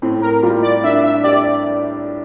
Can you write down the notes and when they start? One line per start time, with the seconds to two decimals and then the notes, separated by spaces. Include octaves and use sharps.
0.02 A2 C4
0.22 A#4
0.43 G3 F4
0.63 D5
0.84 D4 E5
1.04 E5
1.24 G4 D5